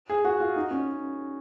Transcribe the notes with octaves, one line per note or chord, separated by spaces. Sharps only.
G#4
F#4
F4
D#4
C#4